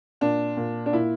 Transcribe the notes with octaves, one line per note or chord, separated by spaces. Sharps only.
A#2 D4
A#2
D4
A#2 E4